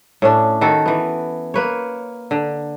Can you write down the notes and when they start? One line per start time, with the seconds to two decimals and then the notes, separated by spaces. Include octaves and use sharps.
0.22 A2 C#4 D4
0.61 D#3 F#4 A4
0.86 E3 B3
1.54 A#3 B4 C#5
2.31 D3